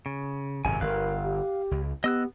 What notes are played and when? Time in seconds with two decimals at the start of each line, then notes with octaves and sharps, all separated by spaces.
0.06 C#3
0.65 G#1 F#2 C3 G#5
0.81 G1 A#4 F5 F#6
1.24 G4
1.71 C#2
2.04 B3 G4 D#5 E6 F#6